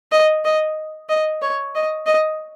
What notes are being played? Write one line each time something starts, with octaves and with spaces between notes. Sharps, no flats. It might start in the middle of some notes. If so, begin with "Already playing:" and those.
D#5
D#5
D#5
C#5
D#5
D#5